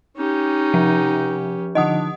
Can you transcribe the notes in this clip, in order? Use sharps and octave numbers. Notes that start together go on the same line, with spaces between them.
C#4 D#4 G4
C3 F3 F#5
D3 F3 D4 D#4 D#5 F#5 D#6